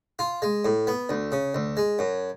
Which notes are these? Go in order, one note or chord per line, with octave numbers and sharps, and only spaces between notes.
F4
G#3
A2
B3
D2
C#3
D2
G#3
F#2